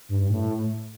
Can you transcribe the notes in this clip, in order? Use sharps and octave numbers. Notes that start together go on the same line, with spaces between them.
G2
G2
A2